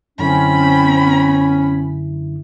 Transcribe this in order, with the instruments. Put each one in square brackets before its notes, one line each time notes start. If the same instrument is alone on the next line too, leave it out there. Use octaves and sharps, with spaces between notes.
[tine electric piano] F#2 D3 E4 [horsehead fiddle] C4 B5 [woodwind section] C#4